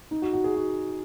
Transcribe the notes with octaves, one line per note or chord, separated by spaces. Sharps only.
D#4
F#4
F#4
G#4
F#4